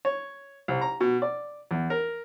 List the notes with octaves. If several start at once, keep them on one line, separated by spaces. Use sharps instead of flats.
C#5
C2
A#5
B2
D5
E2
A#4